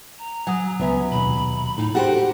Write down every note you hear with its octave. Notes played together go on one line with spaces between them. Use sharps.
A#5
F#3 G#5 D#6
C#2 B3 E5 G#5
D#2 B2 B5
A2 D#4
F#4 G4 A4 C5